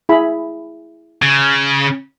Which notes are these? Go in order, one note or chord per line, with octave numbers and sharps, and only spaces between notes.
E4 G#4 B5
C#3